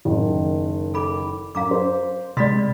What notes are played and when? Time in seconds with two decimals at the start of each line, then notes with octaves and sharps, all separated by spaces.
0.05 F#1 D#3
0.94 A4 B5 D6
1.55 F#2 F5 A#5 D6
1.71 C5
2.37 C3 G#3 D5 B5 C6 A6 B6